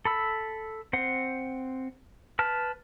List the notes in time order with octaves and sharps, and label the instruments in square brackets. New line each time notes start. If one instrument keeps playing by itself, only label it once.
[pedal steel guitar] A4 B5 E6
C4 C5 F#5
B4 A5 F6